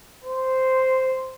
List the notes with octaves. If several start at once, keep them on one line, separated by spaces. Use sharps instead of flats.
C5